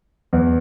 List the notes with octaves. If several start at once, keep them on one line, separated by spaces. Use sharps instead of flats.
E2